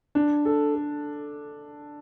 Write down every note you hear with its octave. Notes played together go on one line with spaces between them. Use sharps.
D4
A4
A4